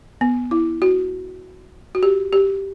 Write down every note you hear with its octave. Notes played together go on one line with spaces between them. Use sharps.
B3
E4
F#4
F#4
G4
G4